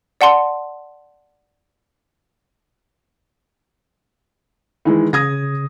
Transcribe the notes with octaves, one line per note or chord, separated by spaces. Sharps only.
D5 F#5 A5 C6 C#7
D#3 E3 G#3 E4
C#3 D#6 G#6 A#6